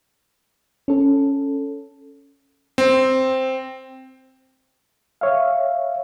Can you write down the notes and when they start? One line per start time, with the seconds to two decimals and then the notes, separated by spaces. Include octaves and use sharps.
0.88 C#4 A4
2.78 C4
5.21 C#5 E5 F5